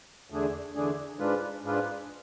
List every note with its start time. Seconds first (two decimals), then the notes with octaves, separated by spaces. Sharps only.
0.30 E2 D3 A3 D4 G#4
0.75 E2 D3 A3 D4 G#4
1.19 G#2 G#3 D4 F4 B4
1.64 G#2 G#3 D4 F4 B4